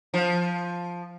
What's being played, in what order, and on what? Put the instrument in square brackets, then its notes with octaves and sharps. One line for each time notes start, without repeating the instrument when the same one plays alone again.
[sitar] F3